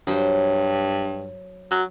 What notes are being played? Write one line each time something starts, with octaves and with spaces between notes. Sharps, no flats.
G2 F#3 C5
F#3